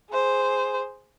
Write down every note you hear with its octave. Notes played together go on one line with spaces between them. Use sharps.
G#4 C5